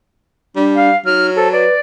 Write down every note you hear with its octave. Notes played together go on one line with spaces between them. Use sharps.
G3 D4
F5
F#3 D#4 F6
A4 C5
B4 D5